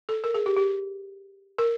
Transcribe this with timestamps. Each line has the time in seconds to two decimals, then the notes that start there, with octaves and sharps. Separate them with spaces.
0.09 A4
0.24 A#4
0.34 G#4
0.46 G4
0.56 G4
1.58 A#4